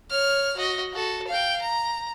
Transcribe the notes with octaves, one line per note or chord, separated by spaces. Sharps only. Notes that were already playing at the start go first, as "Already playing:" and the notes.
C#5 F6
F#4 D#5
F#4 A4
F5 G5
A#5